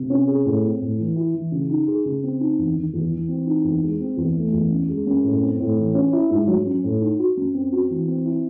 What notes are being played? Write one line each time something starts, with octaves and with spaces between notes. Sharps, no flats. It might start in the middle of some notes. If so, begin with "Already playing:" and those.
Already playing: C3
C#4
G#4
A2
C4
A2
E3
E4
E3
C#3
D#4
G#4
C#3
C4
D#4
E2
D#3
E2
E3
C4
D#4
E2
G#3
C4
E2
A3
E2
F#2
G#3
F#2
A2
C4
A2
E3
C#4
E4
G#2
F#3
C#4
A2
D#4
F#4
F#2
C4
F#4
E3
C4
E4